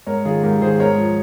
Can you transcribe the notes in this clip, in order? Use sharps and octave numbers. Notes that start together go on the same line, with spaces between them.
G#2 A#4 C#5
D#3 F4 G#4
G#2 G4 A#4
D#3 G#4 C5
G#2 A#4 C#5
F3